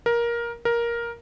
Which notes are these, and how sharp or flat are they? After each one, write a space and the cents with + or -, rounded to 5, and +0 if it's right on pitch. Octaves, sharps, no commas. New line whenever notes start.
A#4 +15
A#4 +10